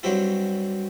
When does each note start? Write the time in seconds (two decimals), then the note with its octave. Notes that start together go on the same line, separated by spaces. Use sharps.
0.03 G2 F#3 C4 E4 G4